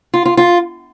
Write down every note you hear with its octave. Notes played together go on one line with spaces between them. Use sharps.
F4
F4
F4